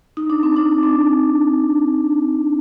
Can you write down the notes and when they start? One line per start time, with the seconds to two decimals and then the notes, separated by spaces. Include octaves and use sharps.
0.17 D#4
0.30 D4
0.43 C4
0.56 D4
0.83 C4